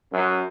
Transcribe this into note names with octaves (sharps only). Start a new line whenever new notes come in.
F#2